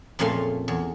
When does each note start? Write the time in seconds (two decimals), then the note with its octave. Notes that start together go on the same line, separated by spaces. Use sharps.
0.19 F2 A#2 C#3 A3 F5 C6
0.68 E2